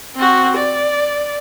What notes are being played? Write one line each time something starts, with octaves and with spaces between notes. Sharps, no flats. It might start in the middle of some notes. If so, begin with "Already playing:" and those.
C4 F#4
D5